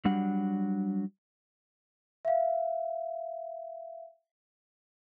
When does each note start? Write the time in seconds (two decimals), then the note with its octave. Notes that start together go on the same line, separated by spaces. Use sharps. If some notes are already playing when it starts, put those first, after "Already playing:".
0.05 F#3 G3 D4 F#5
2.25 E5 F5